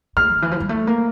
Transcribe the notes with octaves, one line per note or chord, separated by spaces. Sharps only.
A3 F6
D3
E3
F3
G3
A3
A#3